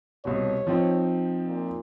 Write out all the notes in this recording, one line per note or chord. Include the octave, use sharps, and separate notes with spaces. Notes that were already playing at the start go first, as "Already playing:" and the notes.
C2 B2 C#5
F3 C4 D#4
A#2